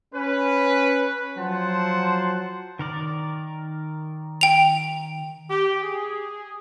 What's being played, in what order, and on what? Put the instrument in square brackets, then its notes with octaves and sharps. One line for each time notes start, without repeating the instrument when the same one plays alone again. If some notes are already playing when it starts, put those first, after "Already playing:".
[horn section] C#4 B4
F3 F#3 C5 F#5 A5 C6
[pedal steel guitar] D#3 A#4 D5
[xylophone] G5 F7
[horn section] G4
G#4